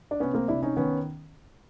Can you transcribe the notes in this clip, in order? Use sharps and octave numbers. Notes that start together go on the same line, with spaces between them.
D4
C3 B3 C#4
A#3 C4
C3 D4 E4
C#4 D#4
D#3 B3 C#4